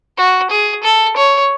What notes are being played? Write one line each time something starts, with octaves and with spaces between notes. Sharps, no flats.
F#4
G#4
A4
C#5